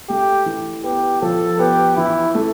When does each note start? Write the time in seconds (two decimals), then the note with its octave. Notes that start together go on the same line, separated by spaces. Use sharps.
0.09 A3 G4
0.46 E3
0.84 B3 G4
1.22 F3 A4
1.59 B3 G4
1.97 E3 E4
2.35 A3